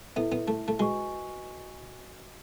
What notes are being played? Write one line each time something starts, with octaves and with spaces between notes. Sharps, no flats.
B3 E4 A4 E5
B3
A3
A3
G#3 F#4 B4 D#5 G#5 C#6